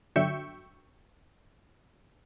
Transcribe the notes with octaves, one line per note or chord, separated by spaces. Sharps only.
G1 D3 F#3 E5 G5 C#6